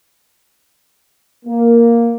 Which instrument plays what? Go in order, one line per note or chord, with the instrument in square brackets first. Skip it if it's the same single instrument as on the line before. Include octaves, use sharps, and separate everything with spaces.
[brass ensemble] A#3